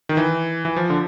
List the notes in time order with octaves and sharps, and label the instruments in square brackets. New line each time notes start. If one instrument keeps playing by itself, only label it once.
[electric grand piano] D#3
E3
E3
F3
D3